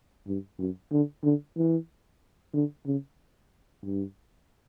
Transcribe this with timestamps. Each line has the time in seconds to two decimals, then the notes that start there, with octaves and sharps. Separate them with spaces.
0.27 G2
0.59 F#2
0.92 D3
1.23 D3
1.57 E3
2.53 D3
2.86 C#3
3.83 G2